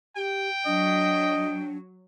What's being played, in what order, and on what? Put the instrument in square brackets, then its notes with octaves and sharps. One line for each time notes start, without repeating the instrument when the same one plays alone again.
[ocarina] G4 [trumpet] G5
[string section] F#3 [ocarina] D4 [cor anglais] D#5